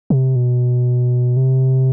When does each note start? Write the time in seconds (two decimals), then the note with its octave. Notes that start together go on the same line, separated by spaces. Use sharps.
0.10 C3
0.36 B2
1.37 C3